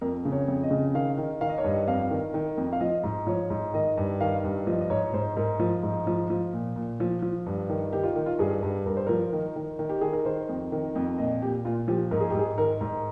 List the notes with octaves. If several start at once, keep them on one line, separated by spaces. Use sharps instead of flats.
F2 A#4
C#3
C#5
F2
D#5
C#3
D#3 F5
D#3
D#3 F5
D#5
C#5
G2 D#5
F2 F5
D#3
D#3
F2
F5
F3 D#5
G#2
F3 C#5
G#2
D#3 D#5
G2
D#3 F5
G2
F3 D#5
D#5
G#2 C#5
G#2 C5
G#2 A#4
F3
G#2
F3
F3
A#2
A#2
F3
F3
G2
D#3
D#3 G4
F4
D#3
F4
G2 G#4
G2
G2 A#4
C5
F3 A#4
D#3
D#3
D#3
G4
D#3 G#4
A#4
D#3 C5
F2
D#3
F2
A#2 D#5
A#2 G4
A#2 F4
F3 G4
G#2 A#4
G#4
G4
G#2 G#4
D#3 A#4
G#2